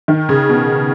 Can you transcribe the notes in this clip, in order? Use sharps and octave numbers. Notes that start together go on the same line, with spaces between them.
D#3
C#3
B2